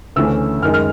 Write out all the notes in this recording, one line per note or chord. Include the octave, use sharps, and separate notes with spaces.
D2 C#3 E3 A3 C#4 E6
F#2 D#3 G#3 F6
F6